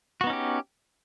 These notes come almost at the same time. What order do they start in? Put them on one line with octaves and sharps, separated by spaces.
F#4 B3 D#4 C#4 G4